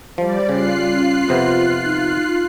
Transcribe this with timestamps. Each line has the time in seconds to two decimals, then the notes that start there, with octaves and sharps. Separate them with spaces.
0.18 F3 G3 C5 D5
0.49 C#3 F4 F#6 C7
0.92 C#4
1.29 F2 C3 B3 C5
1.84 D#4